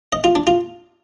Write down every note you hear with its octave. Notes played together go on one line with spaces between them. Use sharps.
D#5
F4
D4
F4